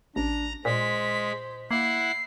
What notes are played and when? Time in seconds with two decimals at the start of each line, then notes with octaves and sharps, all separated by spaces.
0.16 A1 D4 A#5
0.65 A#2 G#3 C5 B6
1.71 A#3 E4 F#5 C7